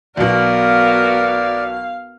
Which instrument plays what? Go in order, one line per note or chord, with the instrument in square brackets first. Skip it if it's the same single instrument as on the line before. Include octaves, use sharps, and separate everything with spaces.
[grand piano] B1 B2 [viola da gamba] B3 F#4 A#4 [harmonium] D5 [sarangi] F5